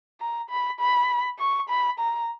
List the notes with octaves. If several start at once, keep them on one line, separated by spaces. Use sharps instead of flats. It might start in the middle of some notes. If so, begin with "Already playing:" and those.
A#5
B5
B5
C#6
B5
A#5